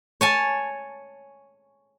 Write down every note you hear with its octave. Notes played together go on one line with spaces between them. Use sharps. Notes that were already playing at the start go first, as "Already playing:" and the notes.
C#5 G#5 A5